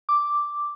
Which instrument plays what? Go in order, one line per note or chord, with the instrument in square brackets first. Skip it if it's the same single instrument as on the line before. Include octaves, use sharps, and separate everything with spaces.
[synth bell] D6